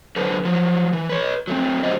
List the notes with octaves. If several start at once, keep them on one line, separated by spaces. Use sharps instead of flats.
D3 F#3 A4 B4 C5
F3 F#3
E3
B4 C#5
F#3 A3 C4
D3 F#3 G3 A3 C5 D#5